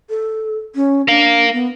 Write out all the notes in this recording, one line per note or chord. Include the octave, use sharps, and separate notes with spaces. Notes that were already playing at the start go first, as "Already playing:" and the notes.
A4
C#4
D4 A#4 F5
B3